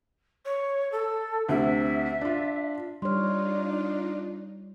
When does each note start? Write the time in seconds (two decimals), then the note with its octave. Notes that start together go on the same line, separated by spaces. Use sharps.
0.45 C#5
0.92 A4
1.49 D2 C3 E5
2.21 D4 F4
3.02 G3 D4 D#4 F4 C#5 C6 F6